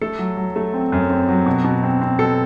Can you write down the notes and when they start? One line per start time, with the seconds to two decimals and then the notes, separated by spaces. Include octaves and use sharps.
0.02 A3 A4
0.19 F#3
0.37 F#3
0.56 A3
0.74 C4
0.92 F#2
1.10 C4
1.29 F#3
1.46 B2
1.64 B2
1.83 C4
2.01 C4
2.19 B2 A4